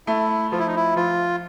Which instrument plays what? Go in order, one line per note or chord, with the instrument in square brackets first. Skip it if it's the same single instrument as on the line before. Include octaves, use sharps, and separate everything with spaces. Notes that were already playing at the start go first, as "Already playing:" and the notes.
[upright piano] A3 [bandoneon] E4
[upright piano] F3 [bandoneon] F4
[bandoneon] E4
D#4
E4
[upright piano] F3 [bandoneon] F4